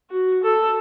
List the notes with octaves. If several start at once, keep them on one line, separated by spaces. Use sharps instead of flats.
F#4
A4